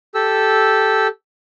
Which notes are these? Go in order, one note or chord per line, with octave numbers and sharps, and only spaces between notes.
G4 A4 E6